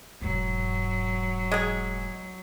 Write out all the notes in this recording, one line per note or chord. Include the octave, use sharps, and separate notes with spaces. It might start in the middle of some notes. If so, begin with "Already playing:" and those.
E1 G#2 F#3
G#3 G#4